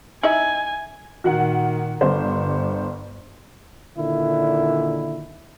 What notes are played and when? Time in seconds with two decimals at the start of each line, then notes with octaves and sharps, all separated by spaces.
0.23 D#4 E4 E5 G#5
1.24 A#2 D#3 F#4 F#5
2.01 G1 G2 C5
3.98 A#2 D3 D#3 E4